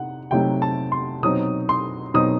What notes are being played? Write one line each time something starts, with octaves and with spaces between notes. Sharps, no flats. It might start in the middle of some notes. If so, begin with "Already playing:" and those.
Already playing: C3 D#4 F#5
C3 F#3 A3 D#4 G5
A5
C6
B2 F#3 C4 D#4 D#6
C6
B2 F#3 C4 D#4 D#6